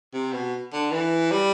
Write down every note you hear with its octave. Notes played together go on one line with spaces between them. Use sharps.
C3
B2
D3
E3
G3